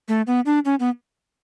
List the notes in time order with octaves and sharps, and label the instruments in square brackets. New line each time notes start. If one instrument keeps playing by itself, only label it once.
[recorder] A3
B3
D4
C#4
B3